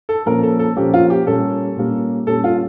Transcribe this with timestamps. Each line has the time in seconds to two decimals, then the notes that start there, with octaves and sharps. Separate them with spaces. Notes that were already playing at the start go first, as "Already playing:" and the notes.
0.09 A4
0.26 A#2 F3 A#3 C#4 A#4
0.43 A4
0.59 A4
0.76 A#2 F3 A#3 C#4 G4
0.94 F4
1.10 G4
1.26 A#2 G3 A#3 C#4 A4
1.76 A#2 G3 A#3 C#4
2.26 A#2 G3 C#4 A4
2.44 F4